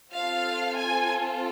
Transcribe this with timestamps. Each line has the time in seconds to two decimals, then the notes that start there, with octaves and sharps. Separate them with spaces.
0.12 C4 F4 A4 F5
0.76 G#5